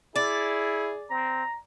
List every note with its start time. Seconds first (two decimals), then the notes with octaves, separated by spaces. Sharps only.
0.16 E4 G#4 D5
1.10 C4 A#5